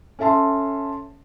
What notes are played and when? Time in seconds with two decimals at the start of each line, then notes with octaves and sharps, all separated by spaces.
0.19 C#4 A4 E5 A5 C6